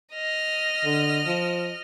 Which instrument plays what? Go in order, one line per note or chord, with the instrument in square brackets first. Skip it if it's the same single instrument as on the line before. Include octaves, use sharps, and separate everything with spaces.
[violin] D#5 F6
[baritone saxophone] D3
F3